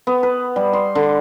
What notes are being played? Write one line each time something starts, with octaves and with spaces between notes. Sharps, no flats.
B3
B4
G3
C6
D3